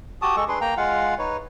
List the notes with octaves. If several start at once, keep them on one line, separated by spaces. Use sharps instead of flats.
F#4 G4 A5 D#6
G#3 A4 C#6
D4 G#4 B4 C6
A#3 G5 A#5
G#3 F4 F5 F#5
D#4 B4 C#5